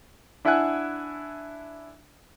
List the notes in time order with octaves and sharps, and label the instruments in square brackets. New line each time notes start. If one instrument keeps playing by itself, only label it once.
[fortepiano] D4 E4 E5 F#5 G#5 F#6